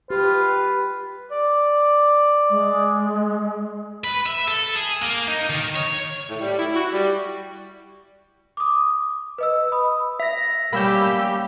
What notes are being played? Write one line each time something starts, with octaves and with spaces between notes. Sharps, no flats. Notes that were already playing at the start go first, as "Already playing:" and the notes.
F4 G4 B4
D5
G#3
B4
E5
A4
G#4
A#3
D#4
D#3
C#5
A2
G3
E4
F#4
G3
D6 D#6
B4 D#5 E6
B5 D#6
E5 A#6
G3 A#3 C#4 G4 B5 E6 G6